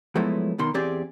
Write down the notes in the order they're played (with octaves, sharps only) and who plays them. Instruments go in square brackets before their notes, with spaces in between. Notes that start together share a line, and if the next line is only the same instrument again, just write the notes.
[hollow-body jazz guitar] F3 F#3 G#3 A3 B3 E4
B1 B2 D#3 C6
E2 C4 G4 G#4 D5